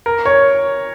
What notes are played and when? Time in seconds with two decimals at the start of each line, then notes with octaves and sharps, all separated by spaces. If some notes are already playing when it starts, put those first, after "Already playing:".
0.06 A#4
0.26 C#5